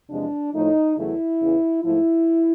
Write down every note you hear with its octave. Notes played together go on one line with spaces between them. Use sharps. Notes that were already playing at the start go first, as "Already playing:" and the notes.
E2 C3 F3 G#3 D4
A2 F3 A3 D#4
E2 C#3 F#3 A3 E4
E2 C#3 E3
G#2 F3 A3 E4